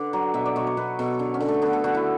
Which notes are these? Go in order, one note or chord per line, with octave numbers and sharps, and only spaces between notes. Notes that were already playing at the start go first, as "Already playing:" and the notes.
Already playing: D3 B4 D5
F#3
B2 E5
D5
B2 C#5
C#5
B2 B4
B2 A4
D3
C#4
D3
A3
D3 B3
A4
D3 F#4
E4